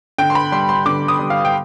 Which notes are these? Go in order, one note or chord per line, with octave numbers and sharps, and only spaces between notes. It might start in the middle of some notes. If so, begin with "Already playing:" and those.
D3 G5
C6
B5
G3 C6
C6
D3 D6
D#6
G3
F5
G5